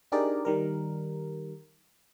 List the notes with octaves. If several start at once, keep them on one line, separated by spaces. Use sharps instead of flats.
D4 D#4 G4 G#4 A#4 D5
D#3 G3 A#4